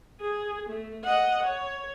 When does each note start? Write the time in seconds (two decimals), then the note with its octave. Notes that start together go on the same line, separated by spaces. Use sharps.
0.21 G#4
0.69 A3
1.04 D#5 F#5
1.43 C#5